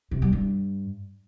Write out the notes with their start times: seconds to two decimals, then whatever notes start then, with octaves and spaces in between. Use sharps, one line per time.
0.11 C3
0.22 G3
0.33 G2